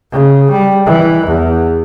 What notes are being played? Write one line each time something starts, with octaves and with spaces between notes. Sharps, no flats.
C#3
G3
E3
E2